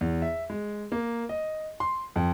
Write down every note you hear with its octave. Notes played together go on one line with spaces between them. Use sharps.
E2
E5
G#3
A#3
D#5
C6
F2